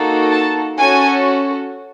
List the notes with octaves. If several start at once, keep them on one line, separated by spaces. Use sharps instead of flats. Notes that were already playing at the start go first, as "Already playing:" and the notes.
Already playing: A#3 D#4 F#4 A4
A5
C#4 F#4 A4 G#5